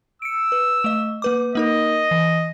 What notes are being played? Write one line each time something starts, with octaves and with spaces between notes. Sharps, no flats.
E6 C#7 D7
B4
A3 D#5
A#3 B4 D6
A#3 D#4 A#4 D#5
E3